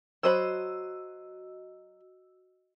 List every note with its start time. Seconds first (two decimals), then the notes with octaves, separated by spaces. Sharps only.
0.23 F#3 F#4 C5 D#5 B5 E6